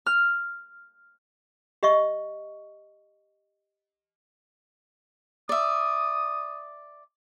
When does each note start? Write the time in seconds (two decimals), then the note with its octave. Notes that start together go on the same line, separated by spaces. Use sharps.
0.06 F6
1.83 G4 D#5 E5 C#6
5.49 D5 E5 D#6